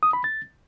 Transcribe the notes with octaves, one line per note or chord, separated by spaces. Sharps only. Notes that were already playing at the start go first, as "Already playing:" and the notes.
D#6
B5
A6